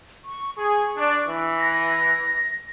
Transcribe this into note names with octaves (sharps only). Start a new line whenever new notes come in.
C#6
G#4 C#6
D4
E3
A#6